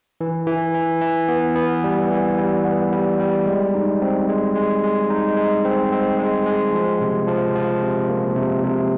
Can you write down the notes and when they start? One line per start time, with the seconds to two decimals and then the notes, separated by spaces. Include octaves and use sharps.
0.21 E3
0.47 E3
0.75 E3
1.01 E3
1.28 B3
1.56 B3
1.84 G3
2.11 E3
2.38 G3
2.65 B3
2.93 G3
3.19 G3
3.46 G#3
3.74 D#4
4.02 C4
4.28 G#3
4.55 G#3
4.83 G#3
5.10 D#4
5.37 G#3
5.65 C4
5.92 C4
6.19 G#3
6.46 G#3
6.73 F3
7.01 C3
7.28 F3
7.56 F3
7.82 C3
8.09 A#3
8.36 C3
8.64 C3